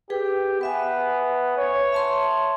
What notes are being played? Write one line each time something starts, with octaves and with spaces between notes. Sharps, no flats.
G4 G#4 B4 G5
B3 B4 E5 G#5
C#5
E5 A5 C6